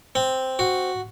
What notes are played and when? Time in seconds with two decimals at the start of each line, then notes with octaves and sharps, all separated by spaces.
0.15 C4
0.59 F#4